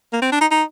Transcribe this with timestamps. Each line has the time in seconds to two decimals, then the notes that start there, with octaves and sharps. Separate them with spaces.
0.13 A#3
0.22 C4
0.32 D4
0.41 D#4
0.51 D#4